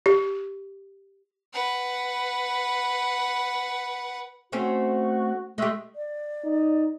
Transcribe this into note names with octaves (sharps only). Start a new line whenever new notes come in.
G4
B4 F#5
A3 C4 C#4 F#4
G#3 A3 G4
D5
D#4